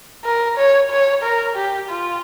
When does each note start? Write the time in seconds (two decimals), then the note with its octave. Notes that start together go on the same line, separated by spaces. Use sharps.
0.25 A#4
0.58 C#5
0.91 C#5
1.23 A#4
1.56 G4
1.89 F4